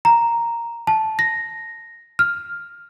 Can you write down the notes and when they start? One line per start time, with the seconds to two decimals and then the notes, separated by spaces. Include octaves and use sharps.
0.05 A#5
0.87 A5
1.19 A#6
2.19 F6